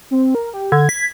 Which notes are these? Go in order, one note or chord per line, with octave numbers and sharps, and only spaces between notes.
C4
A#4
G4
D3 G#6
B6